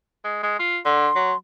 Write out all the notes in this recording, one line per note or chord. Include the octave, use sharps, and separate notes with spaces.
G#3
G#3
F4
D3 C6
F#3